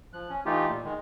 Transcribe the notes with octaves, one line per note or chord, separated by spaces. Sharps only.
F3 F#6
C#4
E3 A3 D#4 F4 G4
A#2
D#3 G#3